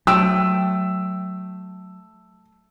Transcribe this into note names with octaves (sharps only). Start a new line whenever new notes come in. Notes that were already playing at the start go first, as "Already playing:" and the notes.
F#3 A3 G5 E6